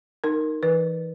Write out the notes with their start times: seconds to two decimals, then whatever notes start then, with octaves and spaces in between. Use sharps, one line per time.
0.24 D#4 A#4
0.63 E3 B4